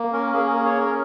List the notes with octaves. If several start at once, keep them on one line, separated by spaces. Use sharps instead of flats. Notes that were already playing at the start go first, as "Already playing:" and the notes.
Already playing: A#3
C#4 A#4
A#3 G#4
G#4 A#4
C#5
C#4 A#4